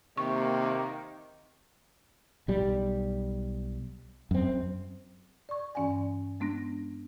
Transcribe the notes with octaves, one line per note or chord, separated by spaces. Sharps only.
C3 D#3 A#3 C#6
B1 G3
F#2 C4
D5 C#6
G2 E3 C#4 D5 F#5 G#5
G#3 B3 D4 F#6 A#6